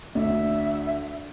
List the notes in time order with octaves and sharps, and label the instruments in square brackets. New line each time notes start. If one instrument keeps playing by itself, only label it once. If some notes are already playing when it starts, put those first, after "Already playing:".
[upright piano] D2 D4 [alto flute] E5